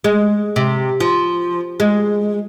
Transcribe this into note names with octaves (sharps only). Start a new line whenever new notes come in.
G#3
C3
F3
G#3